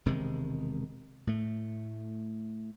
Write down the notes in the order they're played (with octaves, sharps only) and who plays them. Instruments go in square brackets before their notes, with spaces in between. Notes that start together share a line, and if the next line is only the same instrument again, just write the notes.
[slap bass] E1 C3 D#3 G#3
A2 A3